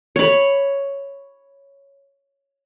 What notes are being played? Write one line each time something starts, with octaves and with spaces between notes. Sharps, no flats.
C#5 B5